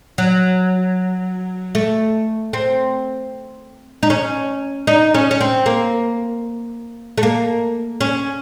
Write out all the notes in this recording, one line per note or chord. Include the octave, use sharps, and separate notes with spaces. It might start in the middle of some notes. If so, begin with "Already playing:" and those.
F#3
A3
C4
D#4
C#4
D#4
C#4
C#4
C4
A#3
A3
A#3
C#4